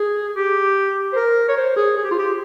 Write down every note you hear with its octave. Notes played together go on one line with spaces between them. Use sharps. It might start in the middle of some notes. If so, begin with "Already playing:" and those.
Already playing: G#4
G4
C5
A#4
C#5
C5
G#4
G#4
G4
F4
G4